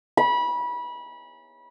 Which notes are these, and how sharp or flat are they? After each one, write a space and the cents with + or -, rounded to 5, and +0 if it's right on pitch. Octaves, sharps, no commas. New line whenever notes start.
B5 -25